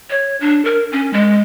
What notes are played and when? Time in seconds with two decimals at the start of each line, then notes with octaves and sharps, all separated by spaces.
0.10 C#5
0.40 D4
0.65 A#4
0.92 C#4
1.13 G#3